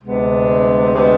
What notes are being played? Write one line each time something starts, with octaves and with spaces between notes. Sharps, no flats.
D2 C3 G#3 B3 D4
D2 C3 G#3 B3 D4